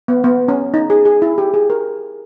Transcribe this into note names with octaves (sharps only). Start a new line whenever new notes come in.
B3
B3
C#4
D#4
G#4
G#4
E4
G4
G#4
A#4